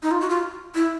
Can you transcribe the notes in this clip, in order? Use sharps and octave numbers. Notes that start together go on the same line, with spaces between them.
D#4
F4
F#4
F4
E4